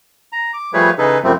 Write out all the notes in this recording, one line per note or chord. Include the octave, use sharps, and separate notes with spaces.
A#5
D6
F3 G3 A3 G#4 B4 C#5
C#3 E3 D#4 G#4 A4 B4
F#2 C3 F3 G3 A3 C4